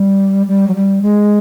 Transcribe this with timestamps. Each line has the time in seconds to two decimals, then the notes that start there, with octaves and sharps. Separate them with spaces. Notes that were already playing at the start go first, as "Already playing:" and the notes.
Already playing: G3
0.48 G3
0.68 F#3
0.75 G3
1.02 G#3